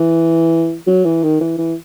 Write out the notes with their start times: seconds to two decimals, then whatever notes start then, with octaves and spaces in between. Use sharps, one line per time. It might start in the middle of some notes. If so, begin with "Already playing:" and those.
Already playing: E3
0.87 F#3
1.05 E3
1.23 D#3
1.41 E3
1.58 E3